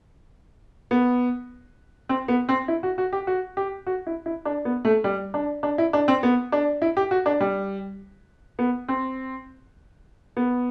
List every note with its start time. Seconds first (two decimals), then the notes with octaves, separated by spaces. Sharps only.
0.91 B3
2.09 C4
2.28 B3
2.49 C4
2.68 E4
2.83 F#4
2.98 F#4
3.13 G4
3.27 F#4
3.57 G4
3.87 F#4
4.07 E4
4.26 E4
4.45 D4
4.65 B3
4.85 A3
5.04 G3
5.34 D4
5.63 D4
5.78 E4
5.93 D4
6.08 C4
6.23 B3
6.52 D4
6.82 E4
6.97 G4
7.11 F#4
7.26 D4
7.41 G3
8.59 B3
8.88 C4
10.37 B3